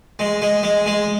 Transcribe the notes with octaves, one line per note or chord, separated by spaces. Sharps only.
G#3
G#3
G#3
G#3